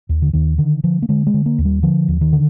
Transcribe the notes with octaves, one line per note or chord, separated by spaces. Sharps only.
D#2
D3
D#2 D#3
D3 D#3
D3 F3
A#3
D3 G#3
G#3
D3
A#3
D#2
G3
D3 F3
D#2
D#3
D3